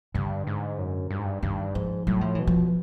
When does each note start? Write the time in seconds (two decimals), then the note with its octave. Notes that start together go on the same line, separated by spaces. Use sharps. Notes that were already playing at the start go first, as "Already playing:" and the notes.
0.14 G2 D3
0.47 G#2
0.78 F#2
1.11 G2
1.19 G#2
1.25 G2
1.43 G2 D#3
1.74 G#2 F3
2.07 A2 F#3
2.21 F3
2.35 B2 E3
2.47 F3